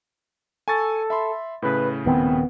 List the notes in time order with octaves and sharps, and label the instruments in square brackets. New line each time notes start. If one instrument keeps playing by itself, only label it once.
[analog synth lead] A4 [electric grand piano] G#5 C#6 A6
[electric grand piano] E5 B5 C6
[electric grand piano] A2 C#3 [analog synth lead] B4
[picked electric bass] D#1 D#3 C4 [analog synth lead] B3